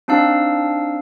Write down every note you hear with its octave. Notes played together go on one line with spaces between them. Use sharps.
C4 D4 D#4 F5 E6